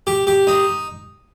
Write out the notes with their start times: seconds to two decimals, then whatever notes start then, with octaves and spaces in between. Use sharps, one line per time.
0.07 G4
0.27 G4
0.47 D#4